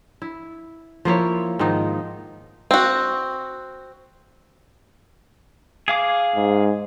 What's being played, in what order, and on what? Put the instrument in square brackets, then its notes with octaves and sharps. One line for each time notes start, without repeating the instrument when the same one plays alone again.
[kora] E4
F3 A#3 E4 C#5
G#2 D#3 F3 D#4
[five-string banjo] C4 F#4
[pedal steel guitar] G#4 F5 D6
[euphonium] G#2